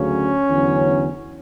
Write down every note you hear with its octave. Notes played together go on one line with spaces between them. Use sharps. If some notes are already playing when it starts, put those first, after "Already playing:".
Already playing: D2 C#3 F#3 C#4
E2 D3 F#3